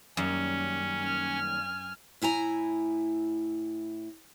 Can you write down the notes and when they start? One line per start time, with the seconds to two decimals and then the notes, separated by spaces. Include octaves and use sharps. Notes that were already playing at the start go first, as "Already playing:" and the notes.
0.17 F#2 D#3 G3 A#3 C#4
1.00 G#5 F6
2.22 A2 E4 G#5 A#5